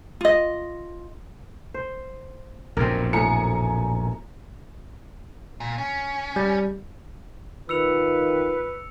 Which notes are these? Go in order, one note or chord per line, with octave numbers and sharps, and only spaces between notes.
F4 D#5
C5
A#1 F#2 B2 C4 A#4
A2 G#5 A#5 C#7
A#2
C#4
G3
D#3 F4 B4 E6 C#7 F7